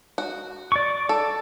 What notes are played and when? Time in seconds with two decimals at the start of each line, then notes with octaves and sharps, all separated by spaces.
0.18 F#4
0.72 D5 C#6
1.09 A4